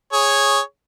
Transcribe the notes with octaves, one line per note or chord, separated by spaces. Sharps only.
G#4 C#5